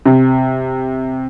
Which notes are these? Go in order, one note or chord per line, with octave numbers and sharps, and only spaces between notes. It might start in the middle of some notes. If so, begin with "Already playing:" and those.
C3